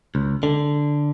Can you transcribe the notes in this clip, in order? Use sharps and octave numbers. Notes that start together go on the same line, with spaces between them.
C#2
D3